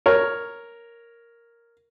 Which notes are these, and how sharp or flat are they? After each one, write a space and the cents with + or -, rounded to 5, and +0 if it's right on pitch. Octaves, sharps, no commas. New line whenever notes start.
A#4 +0 C#5 +0